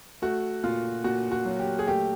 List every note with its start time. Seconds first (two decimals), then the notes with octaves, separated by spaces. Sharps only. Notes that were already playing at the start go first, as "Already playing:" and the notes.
0.22 A3 F#4
0.63 A#2 F4
1.04 A#2 F#4
1.32 F#4
1.45 F#3
1.60 G4
1.79 G#4
1.87 A3 G4